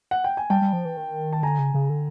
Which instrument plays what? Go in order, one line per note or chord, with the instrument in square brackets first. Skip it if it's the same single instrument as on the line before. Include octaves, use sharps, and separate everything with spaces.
[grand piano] F#5
G5
G#5
[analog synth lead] G3 [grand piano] G5 A5
[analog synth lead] G3
F3
E3
D#3
[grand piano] A5
[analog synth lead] D3 [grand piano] G#5 A#5
[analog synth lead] C#3
C#3
D3